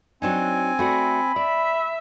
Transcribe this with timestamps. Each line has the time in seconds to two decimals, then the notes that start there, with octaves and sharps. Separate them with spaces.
0.22 F#3 C4 D4 D#4 G#5
0.79 A3 F#4 D5 B5
1.36 D5 E5